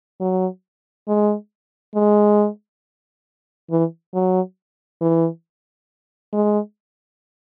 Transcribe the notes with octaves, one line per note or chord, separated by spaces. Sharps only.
F#3
G#3
G#3
E3
F#3
E3
G#3